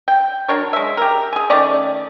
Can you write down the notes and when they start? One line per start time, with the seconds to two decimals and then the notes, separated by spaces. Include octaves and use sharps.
0.08 G5
0.48 F#3 D4 A#4 C#5
0.73 G#3 E5
0.97 G4 A#4
1.33 G#4 G#5
1.50 D#3 A3 C#4 D5